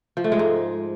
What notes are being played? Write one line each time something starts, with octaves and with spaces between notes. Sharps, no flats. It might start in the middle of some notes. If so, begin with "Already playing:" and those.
F3
A3
G#3
G#2